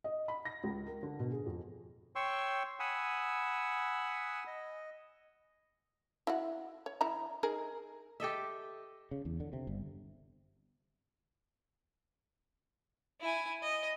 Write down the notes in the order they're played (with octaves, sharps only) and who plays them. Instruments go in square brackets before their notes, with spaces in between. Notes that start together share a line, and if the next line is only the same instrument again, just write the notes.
[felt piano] D#5
B5
A#6
C#2
A#4
D3
B2
G#4
F2
[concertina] C#5 G5 C6 C#6 E6
F#5 G#5 B5 D#6 E6
D#5
[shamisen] E4 F#4 F#5
C#5
E3 E4 A#5
D#4 G#4 A#4
[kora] G4 A4 D#5 E5
[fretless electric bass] C#3
E2
D3
C3
G1
[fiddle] E4 G#5
D#5